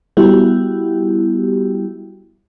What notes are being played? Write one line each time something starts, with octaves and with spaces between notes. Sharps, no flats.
G3 B3 E4 F#4 G4